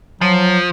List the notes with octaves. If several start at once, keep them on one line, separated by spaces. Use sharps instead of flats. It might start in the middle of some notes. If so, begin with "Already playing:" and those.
F3 F#3